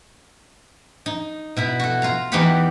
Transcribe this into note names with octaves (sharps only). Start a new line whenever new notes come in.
D#4
B2 E4 B5
F#4 A4
F4 F5 A#5
E2 E3 D#4 G4 F#5 B5